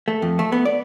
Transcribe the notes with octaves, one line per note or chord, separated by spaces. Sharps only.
A3
F2
A3
B3
D5